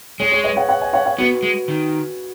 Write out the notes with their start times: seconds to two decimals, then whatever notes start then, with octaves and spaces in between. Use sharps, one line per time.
0.19 G#3 G#4 C#5
0.31 G#4 C#5
0.44 B4 D#5
0.56 C#5 F#5
0.68 C#5 F#5
0.81 D#5 G#5
0.93 C#5 F#5
1.06 C#5 F#5
1.18 B3 F#4 B4
1.43 G#3
1.68 D#3